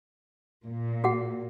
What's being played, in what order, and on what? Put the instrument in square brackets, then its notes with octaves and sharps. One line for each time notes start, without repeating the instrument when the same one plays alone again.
[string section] A#2
[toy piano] F#4 G#4 F#5